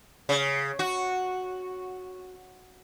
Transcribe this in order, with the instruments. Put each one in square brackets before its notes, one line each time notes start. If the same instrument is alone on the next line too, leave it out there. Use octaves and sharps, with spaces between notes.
[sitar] C#3
F#4